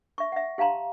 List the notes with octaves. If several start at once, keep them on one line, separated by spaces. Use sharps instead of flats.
E5 C#6
E5 F#5
G4 F5 A5 A#5 C6